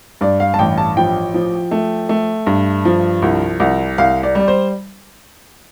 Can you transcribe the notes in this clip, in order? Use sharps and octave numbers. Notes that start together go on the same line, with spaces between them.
G2 D5
F5
A5
A1 G5
A5
F3 G5
F3
A3
A3
G2
F3
C2
C2
C2 F5
D5
G3 D5
C5